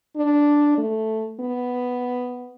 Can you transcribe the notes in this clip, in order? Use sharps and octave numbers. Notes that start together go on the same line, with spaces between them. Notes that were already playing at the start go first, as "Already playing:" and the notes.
D4
A3
B3